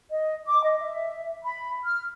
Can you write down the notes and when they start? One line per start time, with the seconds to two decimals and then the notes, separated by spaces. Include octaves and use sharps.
0.10 D#5
0.47 D6
0.63 D#5
0.79 E5
1.44 B5
1.85 F6